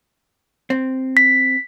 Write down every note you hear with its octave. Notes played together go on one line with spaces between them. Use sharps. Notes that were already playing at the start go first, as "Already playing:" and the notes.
C4
B6